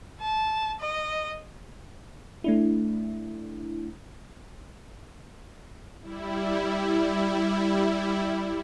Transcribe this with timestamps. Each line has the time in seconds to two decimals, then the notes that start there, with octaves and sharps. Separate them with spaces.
0.21 A5
0.80 D#5
2.44 A3 D4 E4
6.02 G3 E4